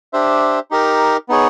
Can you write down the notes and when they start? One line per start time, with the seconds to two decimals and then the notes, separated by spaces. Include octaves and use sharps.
0.13 D4 G4 C5 E5
0.71 D#4 G4 A#4
1.29 B3 D#4 G#4 C#5